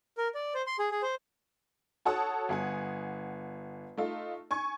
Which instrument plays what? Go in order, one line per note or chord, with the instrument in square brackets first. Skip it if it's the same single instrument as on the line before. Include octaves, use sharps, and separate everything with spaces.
[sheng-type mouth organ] A#4
D5
C5
C6
G#4
G#4
C5
[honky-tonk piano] F#4 A4 C#5 F#5 A5 D#6
G1 F#5 G#5
A3 D#4 F4
G#5 C#6 G#6